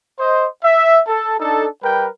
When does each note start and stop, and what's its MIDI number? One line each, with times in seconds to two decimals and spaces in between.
0.19 0.47 72
0.19 0.47 75
0.63 1.01 76
1.07 1.36 69
1.40 1.67 62
1.40 1.67 63
1.40 1.67 69
1.83 2.07 55
1.83 2.07 70
1.83 2.07 71
1.83 2.07 79